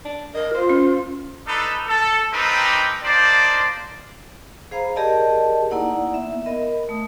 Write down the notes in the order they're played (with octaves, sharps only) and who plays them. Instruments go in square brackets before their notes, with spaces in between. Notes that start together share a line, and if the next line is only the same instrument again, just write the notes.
[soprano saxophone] D4
[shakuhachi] A#4 [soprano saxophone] D#5
[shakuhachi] F4 [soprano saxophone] C5
[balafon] C#4
[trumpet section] D4 D#4 A4 B4
A4
C4 D4 D#4 G4 A#4 B4
A#3 D4 D#4 C5 D5
[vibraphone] G#4 C5 F5 A#5 B5
G4 G#4 A#4 D5 D#5 A5
A#3 D#4 E4 D5 F#5
B3 E5
A#4 D#5 B5
A3 D#6